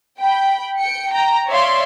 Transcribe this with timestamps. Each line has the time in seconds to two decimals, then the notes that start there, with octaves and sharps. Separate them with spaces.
0.20 G5 B5
0.80 G5 C#7
1.12 G5 A#5
1.49 C#5 D5 E5 F5 C6